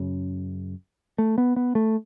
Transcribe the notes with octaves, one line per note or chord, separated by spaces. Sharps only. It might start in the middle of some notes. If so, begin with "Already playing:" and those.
Already playing: F#2 C#3
A3
B3
B3
A3